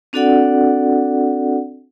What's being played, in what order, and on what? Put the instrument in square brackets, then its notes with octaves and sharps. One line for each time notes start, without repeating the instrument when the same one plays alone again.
[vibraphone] C4 D4 F#4 A4 D5 F#5